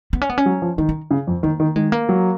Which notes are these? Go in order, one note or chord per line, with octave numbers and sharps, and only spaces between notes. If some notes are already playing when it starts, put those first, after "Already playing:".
B3
C#4
B3
C#4
F#3
F3
D#3 D#4
D#4
C#3
F2
D#3 A#3
D#3
D#3 G#3
A#3
F#3